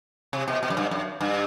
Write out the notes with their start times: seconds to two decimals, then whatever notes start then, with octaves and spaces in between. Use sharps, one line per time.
0.33 C3
0.48 B2
0.63 B2
0.70 F#2
0.77 G2
0.91 F#2
1.21 G2